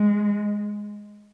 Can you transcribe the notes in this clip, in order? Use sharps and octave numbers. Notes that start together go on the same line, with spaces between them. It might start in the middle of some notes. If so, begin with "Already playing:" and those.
Already playing: G#3